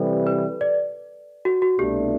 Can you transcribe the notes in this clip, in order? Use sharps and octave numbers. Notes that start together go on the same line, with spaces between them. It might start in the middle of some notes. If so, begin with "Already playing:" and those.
Already playing: C3 E3 G3 A4
B4
D5
F#4
F#4
C2 B2 A3 D4 G4